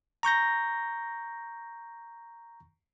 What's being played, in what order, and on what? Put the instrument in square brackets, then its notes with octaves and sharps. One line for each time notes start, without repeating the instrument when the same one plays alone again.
[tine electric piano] A#5 C#6 G6 A#6